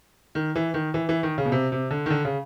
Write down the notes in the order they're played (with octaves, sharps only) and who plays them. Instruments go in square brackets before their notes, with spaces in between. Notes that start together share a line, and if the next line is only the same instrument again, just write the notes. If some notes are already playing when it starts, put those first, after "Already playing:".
[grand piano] D#3
E3
D#3
E3
E3
D#3
C#3
B2
C3
C3
D3
D#3
D3
C#3